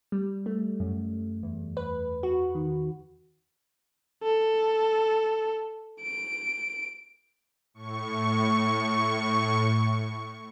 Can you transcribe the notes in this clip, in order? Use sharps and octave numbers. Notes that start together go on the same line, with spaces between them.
G3
A3
F#2
E2
B4
F#4
D#3
A4
D7
A2 C#6